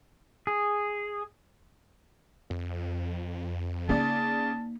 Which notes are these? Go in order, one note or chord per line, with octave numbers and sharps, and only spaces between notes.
G#4
F2
C#3 A#3 D#4 D5 A5